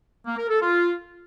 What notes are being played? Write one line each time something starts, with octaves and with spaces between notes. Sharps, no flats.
A#3
A#4
A4
F4